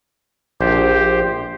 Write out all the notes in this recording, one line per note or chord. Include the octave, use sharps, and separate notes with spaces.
A#1 G4 C5